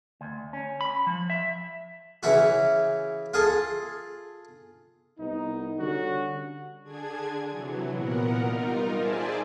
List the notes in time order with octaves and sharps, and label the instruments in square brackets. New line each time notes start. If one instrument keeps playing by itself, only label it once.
[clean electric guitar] D2
C#4
B5
F3
E5
[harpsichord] C#3 E3 E4 F#4
F4 G#4 A4
[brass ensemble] C2 B3 D#4
D3 G3 C#4 F#4
[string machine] D3 D4 G#4 G#6
C3 E3 F#3
A#2 B3 A#4 F#5
G3 D#4 F4 A#4
G#4 C5 D5 E5 G#5 A5